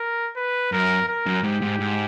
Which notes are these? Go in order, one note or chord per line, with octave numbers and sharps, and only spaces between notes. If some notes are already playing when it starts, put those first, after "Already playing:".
Already playing: A#4
B4
F#2 A#4
A#4
F#2
G#2 G4
G#2
G#2